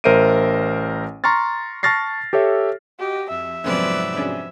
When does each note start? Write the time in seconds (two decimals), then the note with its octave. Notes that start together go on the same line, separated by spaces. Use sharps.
0.04 A1 A#4 C5 E5 D7 D#7
1.24 A#5 C6 C#6 F6 A6
1.83 A5 C#6 F6 A6 A#6 C7
2.33 G4 A4 C#5 E5
2.99 F#4 G4 D#5
3.30 F2 E5
3.64 F2 G#2 C3 F#3 B3 C#4 B4 D5
4.16 C#4 D4 G#4